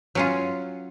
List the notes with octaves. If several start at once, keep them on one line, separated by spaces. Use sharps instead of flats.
F#3 C#4 F4